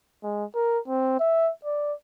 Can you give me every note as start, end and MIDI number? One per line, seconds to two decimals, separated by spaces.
0.23 0.45 56
0.55 0.79 70
0.88 1.15 60
1.20 1.51 76
1.65 1.93 74